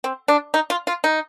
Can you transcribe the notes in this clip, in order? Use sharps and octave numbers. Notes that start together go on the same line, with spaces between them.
C4
D4
D#4
F4
F4
D#4